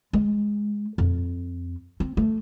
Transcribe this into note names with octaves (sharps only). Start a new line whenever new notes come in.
G#3
F2
C4
A3